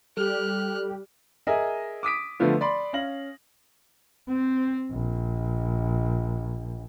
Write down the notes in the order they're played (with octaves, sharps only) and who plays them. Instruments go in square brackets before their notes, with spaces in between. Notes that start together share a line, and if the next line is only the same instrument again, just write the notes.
[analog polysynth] G3 G4 [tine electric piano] A4 [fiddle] F6 F#6
[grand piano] G#4 A#4 D#5 E5 G#5
D6 D#6 B6 D7
D3 F3 A3 B3 F4
D5 B5 C6
C#4 F5 A#6 F#7
[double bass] C4
A#1